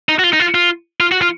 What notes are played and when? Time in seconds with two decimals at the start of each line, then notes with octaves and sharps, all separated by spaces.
0.09 D#4
0.19 F#4
0.24 F4
0.33 D#4
0.40 F4
0.54 F4
1.00 F4
1.12 F#4
1.22 F4